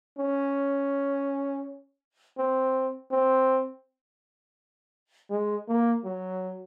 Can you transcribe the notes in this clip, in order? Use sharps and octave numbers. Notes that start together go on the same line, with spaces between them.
C#4
C4
C4
G#3
A#3
F#3